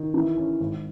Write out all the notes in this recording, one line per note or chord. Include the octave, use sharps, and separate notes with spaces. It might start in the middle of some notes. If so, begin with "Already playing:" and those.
Already playing: D#3
E3
C#4
G#1